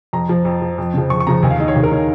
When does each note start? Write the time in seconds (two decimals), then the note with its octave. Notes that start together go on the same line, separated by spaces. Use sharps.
0.13 F2 A#5
0.29 F3
0.45 F2
0.62 F3
0.78 F2
0.94 C#3 F3
1.10 F2 C#6
1.20 C#6
1.27 C#3 F3 A#5
1.43 D#2 G#5
1.51 F5
1.60 D#3 D#5
1.68 C#5
1.75 D#2 G#4
1.84 A#4
1.92 D#3 C#5